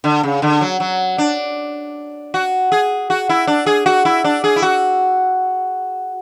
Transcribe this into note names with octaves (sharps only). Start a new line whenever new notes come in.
D3
C#3
D3
F#3
F#3
D4
F#4
G#4
F#4
E4
D4
G#4
F#4
E4
D4
G#4
E4
F#4